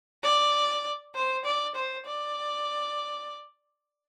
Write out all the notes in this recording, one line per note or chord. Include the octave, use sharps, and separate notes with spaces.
D5
C5
D5
C5
D5